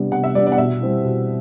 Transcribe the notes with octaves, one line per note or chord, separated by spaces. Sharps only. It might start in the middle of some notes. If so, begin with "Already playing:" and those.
Already playing: C3 G3 B3 D4
C3 F#5
E5
G3 B3 D4 D5
D5
F#5
B2 E5
G3 C4 E4
B2